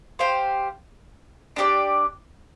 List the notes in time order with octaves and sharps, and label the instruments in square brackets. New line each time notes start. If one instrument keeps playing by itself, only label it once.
[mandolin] G4 C5 F5
D4 G4 A#4 D5